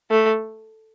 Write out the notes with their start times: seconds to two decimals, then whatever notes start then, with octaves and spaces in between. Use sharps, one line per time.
0.11 A3